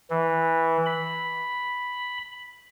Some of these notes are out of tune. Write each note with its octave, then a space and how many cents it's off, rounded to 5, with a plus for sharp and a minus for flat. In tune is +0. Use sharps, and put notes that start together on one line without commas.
E3 -10
B5 +0